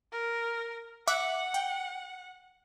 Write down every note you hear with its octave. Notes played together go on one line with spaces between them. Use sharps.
A#4
E5 F#5 D6 F#6
G5